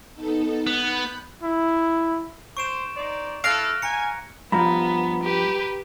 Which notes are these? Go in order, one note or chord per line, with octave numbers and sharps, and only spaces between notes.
B3 D#4 A4
B3 B5 F#6 G6
E4
C5 C#6 D7 E7
D#4 C5 D5
E4 A4 F5 F#6 A#6 D7
G#5 A#5 C#7
G2 F3 B3 A#5 B5
G4 B4